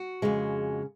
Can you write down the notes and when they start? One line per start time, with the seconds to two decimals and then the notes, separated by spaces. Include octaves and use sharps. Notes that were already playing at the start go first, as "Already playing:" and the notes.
Already playing: F#4
0.22 F2 C#3 G#3